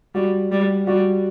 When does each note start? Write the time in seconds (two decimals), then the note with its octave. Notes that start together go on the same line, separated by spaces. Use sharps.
0.15 G3 F#4
0.51 G3
0.87 G3 F#4